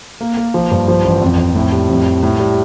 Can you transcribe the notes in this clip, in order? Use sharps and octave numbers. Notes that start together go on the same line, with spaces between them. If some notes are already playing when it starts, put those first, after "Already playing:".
A#3
A#3
F3
G2
F3
A1
F2
F2
A2
G3
F2
G3
A2
G3